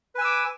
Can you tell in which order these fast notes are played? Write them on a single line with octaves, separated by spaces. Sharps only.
B4 G#5 E6 D6